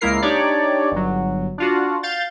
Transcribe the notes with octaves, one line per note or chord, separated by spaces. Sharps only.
C#2 G#3 A#3 E4 A#4 C7
D4 D#4 G4 C#5 D5
G1 F#3
D4 F4 F#4
F5 G6 A6